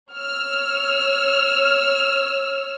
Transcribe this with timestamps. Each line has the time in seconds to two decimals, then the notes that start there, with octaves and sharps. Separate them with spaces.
0.12 C#5 E6 F6